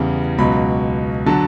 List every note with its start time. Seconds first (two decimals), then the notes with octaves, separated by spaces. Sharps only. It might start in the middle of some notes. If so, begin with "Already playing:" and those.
Already playing: E2 C#3 E3 G3
0.38 C#2 B2 F#3 B5
1.26 D3 F#3 A5